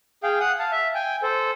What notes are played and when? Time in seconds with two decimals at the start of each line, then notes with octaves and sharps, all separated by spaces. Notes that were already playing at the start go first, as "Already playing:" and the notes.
0.23 G#4 F5 G5
0.40 F#5 D#6
0.59 F5 A5
0.72 E5
0.95 G5 G#5
1.23 A4 C5